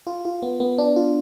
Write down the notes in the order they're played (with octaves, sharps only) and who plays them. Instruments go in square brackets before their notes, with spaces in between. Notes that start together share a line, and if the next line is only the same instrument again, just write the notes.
[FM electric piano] F4
F4
B3
B3
D4
F4